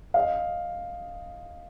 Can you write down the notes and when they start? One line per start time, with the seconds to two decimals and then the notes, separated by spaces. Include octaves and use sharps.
0.14 D#5 F5